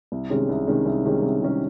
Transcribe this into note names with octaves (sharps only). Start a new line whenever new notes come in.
C2
C3 D#3 G#3 C#4
C2
C3 D#3 G#3 C#4
C2
C3 D#3 G#3 C#4
C2
C3 D#3 G#3 C#4